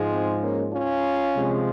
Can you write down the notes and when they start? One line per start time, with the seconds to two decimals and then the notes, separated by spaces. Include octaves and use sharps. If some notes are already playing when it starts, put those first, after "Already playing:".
Already playing: G#2 F3 G#3
0.10 C4
0.41 A#3 C#4
0.72 C#4 F4
1.36 C3 F3 G#3